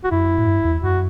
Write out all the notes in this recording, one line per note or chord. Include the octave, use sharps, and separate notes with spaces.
F#4
F#2 E4
A2
G2
E2
F#2 F#4